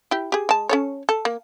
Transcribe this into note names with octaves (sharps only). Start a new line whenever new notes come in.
E4 G4
G4 G#4
G#3 A5
C#4 A4 C#5
A4
A#3